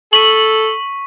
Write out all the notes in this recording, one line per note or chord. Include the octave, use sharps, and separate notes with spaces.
A4 C#6 B6 D#7 F#7